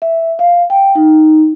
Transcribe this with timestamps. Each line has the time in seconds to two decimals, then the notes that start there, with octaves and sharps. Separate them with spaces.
0.02 E5
0.39 F5
0.70 G5
0.95 D#4